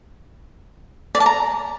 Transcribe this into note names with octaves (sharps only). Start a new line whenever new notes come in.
D5
A5
A#5